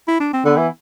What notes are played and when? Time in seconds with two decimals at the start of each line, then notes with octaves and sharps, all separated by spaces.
0.08 E4
0.20 D4
0.33 C4
0.45 D3 B3
0.57 E3